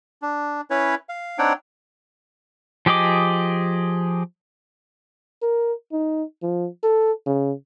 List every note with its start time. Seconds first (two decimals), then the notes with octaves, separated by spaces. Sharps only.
0.22 D4
0.70 C#4 E4 B4 C#5
1.09 F5
1.38 C4 D4 D#4 C#5 F#5 G5
2.86 F3 G4 G#4 D#5 D6
5.42 A#4
5.92 D#4
6.43 F3
6.83 A4
7.26 C#3